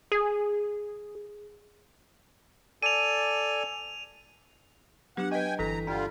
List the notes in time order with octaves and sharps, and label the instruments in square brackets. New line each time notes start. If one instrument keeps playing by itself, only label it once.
[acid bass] G#4
[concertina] A4 D5 G#5 [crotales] D#7 F7
[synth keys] F#3 [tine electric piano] B3 [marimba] D4 G4 [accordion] F#5
[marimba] B4 D#5 [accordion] G5 G#5
[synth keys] G1 A4 B6 [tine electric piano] E3 [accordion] A#5
[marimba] G2 [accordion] D3 G3 F4 [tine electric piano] D4 G5